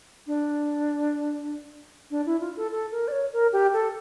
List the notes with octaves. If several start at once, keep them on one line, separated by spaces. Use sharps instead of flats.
D4
D4
E4
F4
A4
A4
A#4
D5
C#5
A#4
G4
A4